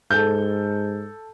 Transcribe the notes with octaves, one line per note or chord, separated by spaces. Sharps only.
G#2 A4 G6